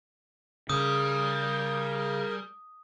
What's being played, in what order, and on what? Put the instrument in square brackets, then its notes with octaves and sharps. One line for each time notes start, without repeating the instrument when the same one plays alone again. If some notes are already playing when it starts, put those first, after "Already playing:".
[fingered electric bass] C#3 [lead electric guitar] G3 [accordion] G#4 A#4 [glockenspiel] D#6